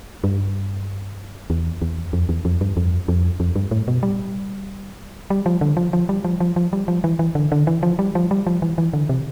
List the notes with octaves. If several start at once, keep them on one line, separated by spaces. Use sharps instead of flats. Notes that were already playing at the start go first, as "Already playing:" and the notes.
G2
E2
E2
F2
E2
F2
G2
F2
F2
F2
G2
A2
B2
G3
G3
F3
D3
F3
F3
G3
F3
F3
F3
G3
F3
E3
E3
D3
D3
E3
F3
G3
F3
G3
F3
E3
E3
D3
C3